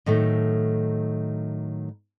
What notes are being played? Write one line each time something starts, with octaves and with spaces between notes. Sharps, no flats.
A2 D#3 F#3 A3